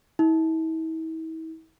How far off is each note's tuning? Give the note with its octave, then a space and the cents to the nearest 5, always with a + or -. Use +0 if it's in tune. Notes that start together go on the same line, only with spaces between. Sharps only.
E4 -40